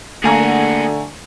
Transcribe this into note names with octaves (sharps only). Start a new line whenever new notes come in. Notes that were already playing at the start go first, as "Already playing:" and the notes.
D3 A3 A#3 F#4 G#4 G#5 A#5